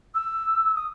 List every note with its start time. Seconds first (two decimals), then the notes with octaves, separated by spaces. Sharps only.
0.14 E6
0.75 D#6